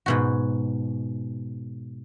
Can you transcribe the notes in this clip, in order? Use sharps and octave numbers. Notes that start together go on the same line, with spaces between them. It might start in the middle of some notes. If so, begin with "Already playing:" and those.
G#2 B2 F#4